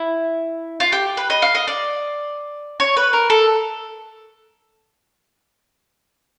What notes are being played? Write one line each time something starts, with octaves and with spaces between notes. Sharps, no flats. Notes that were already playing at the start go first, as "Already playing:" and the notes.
Already playing: E4
F4
G4
B4
D#5
F5
D#5
D5
C#5
B4
A#4
A4